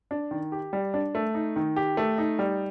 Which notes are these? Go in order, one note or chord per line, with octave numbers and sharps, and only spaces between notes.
D4
D#3
G4
G3
D4
A3
D#4
D#3
G4
A3
D#4
G3